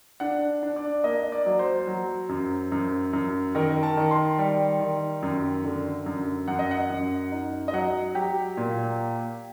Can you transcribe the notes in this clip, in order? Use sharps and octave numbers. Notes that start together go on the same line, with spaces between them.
D4 F#5
D4
D5
A#3 D#5
D5
F#3
C5
F#3
F#2
F#2
F#2
D#3 A#4
A5
D#3
C6
G3
D#3
F#2
D3
F#2
F#2 F#5
D#5
F#5
F#2
D#4
D#5
F#3 F#5
F#3 G4
A#2